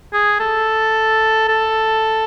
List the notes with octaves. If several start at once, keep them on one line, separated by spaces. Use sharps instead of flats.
G#4
A4
A4